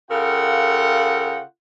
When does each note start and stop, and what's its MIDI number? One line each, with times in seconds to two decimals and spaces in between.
0.11 1.41 49
0.11 1.41 65
0.11 1.41 69
0.11 1.41 70
0.11 1.41 78
0.11 1.41 79